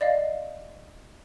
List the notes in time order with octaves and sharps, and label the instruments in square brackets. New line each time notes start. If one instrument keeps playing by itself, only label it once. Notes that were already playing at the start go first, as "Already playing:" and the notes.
[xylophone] D5 D#5 F5